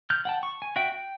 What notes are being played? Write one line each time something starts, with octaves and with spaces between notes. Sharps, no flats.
F6 G6
F#5 G5 A5
C#6
G#5
F#4 E5 G5
G5